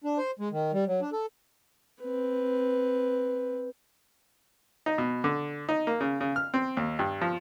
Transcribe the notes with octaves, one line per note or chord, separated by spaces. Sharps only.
D4
C5
G#3
D#3
G3
F#3
D4
A4
C4 B4
D#4
B2
D3
D#4
A#3
C#3
C#3
F6
C4
D#2
G2
F3